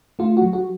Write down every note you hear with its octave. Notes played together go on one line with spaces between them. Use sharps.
A3 F4
F#4
F#3
F#4